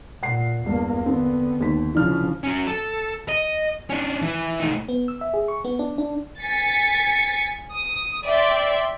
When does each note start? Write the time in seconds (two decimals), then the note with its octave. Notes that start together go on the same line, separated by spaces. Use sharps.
0.23 A#2 F#5 C7
0.66 E2 G2 A#3
1.06 D3 B3 C4
1.60 D#2 B6
1.95 C#3 E3 F3 D4 F6
2.44 C#4 F#4
2.67 A4
3.28 D#5
3.90 C#4 D4
4.22 E3
4.60 A3 D#4
4.88 B3
5.08 E6
5.21 E5
5.34 G#4
5.48 C#6
5.65 B3
5.79 D4
5.98 D4
6.41 G#5 A6 B6 C#7
7.71 D#6
8.26 D5 E5 G5 C6